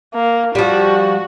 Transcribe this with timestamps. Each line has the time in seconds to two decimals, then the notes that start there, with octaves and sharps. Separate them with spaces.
0.14 A#3
0.55 F3 G3 F#4